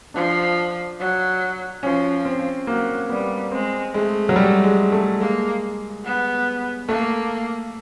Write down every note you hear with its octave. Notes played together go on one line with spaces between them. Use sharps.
F3 D4
F#3
F3 C#4
C4
F#3 A#3
G3 B3
G#3 C4
G#3 A3
F#3
G3
G#3
A3
G#3 A#3
B3
A3 A#3